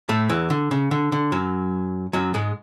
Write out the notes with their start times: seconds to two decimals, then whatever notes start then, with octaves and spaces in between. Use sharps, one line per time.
0.09 A2 A3
0.29 E2 E3
0.50 D3
0.71 C#3
0.91 D3
1.12 D3
1.32 F#2 F#3
2.13 F#2 F#3
2.34 G#2 G#3